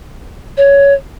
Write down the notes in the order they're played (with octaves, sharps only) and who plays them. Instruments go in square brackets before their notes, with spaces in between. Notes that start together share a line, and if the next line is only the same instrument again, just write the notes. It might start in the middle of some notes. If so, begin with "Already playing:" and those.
[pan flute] C#5